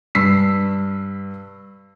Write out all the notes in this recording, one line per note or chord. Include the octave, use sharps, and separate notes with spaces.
G2 E6 B6 C7